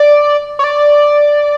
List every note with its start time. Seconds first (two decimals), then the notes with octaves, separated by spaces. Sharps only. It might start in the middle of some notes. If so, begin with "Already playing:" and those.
Already playing: D5
0.59 C#5
0.64 D5